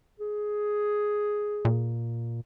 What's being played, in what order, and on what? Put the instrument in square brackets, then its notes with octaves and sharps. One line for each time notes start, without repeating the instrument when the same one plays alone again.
[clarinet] G#4
[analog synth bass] A#2